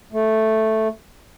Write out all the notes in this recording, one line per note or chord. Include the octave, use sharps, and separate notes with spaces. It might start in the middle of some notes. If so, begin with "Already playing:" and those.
A3